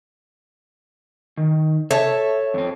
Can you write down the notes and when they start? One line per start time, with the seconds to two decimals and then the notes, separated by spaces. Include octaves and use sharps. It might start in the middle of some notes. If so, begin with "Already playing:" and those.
1.38 D#3
1.91 A4 C#5 E5
2.54 F2 C4